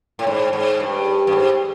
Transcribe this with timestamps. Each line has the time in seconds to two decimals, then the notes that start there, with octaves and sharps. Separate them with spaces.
0.19 A2
0.27 G#2
0.53 G#2
0.80 G2
1.27 G2
1.32 G#2